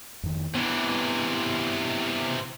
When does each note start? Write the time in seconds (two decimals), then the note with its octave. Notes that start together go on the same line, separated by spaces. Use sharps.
0.24 F2 D#3
0.55 C3 E3 B3